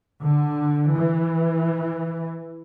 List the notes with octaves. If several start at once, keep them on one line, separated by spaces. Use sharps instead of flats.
D3
E3